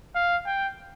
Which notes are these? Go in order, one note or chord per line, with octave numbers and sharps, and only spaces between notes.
F5
G5